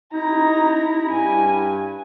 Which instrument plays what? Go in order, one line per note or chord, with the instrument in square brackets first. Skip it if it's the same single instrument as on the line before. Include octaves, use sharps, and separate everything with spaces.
[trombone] D#4 [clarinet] E4 [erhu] A#5
[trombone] G2 [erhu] G#5